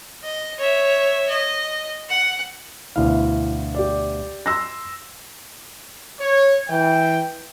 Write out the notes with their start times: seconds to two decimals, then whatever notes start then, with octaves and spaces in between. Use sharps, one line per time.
0.24 D#5
0.58 C#5 E5
1.29 D#5
2.10 F#5
2.96 D2 B2 E4 F5
3.75 G4 D5
4.46 C6 E6 A#6
6.20 C#5
6.69 E3 G5